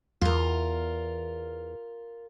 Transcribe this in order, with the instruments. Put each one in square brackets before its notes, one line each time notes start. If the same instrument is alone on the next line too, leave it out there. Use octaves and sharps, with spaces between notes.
[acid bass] E2 [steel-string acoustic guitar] F4 A#4